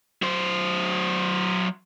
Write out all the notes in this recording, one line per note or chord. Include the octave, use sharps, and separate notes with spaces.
F#3 C5